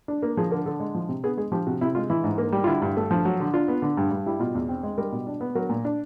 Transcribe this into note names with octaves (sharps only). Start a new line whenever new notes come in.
D4
A#3
F3 G#4
D3 A#4
D3 A4
G#3
F3
C3
B3 G#4
G#3 G#4
F3 G4
C3 F#4
C3 E4
G#3 F4
E3 E4
G#2
A#3
G3
F4
D3 E4
G2
A3
F3
F#3
D3
D4 F4
B3
D3
G2
G2
G3 E4
B2 F4
E2
C4
G#3
G3 A#4
B2
D4
B3
F#3 A#4
A#2
D4